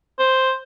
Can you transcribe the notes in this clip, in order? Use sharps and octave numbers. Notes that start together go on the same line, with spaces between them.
C5